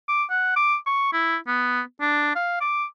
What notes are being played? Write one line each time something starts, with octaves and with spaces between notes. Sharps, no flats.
D6
F#5
D6
C#6
E4
B3
D4
F5
D6